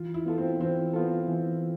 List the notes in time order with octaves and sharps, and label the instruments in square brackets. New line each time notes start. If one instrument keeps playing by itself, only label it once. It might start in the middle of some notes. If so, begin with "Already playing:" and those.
Already playing: [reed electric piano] E3 [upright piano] F4
[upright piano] E4
[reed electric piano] B3 F4 A4
[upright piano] C4
[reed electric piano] E3 [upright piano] C4
[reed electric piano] B3 F4 A4
E3